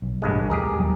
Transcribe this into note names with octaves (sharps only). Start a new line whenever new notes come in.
B1
A1 G2 G#3
D#1 E2 G#3 G4 G#4 A#4
D#2 F#3 G3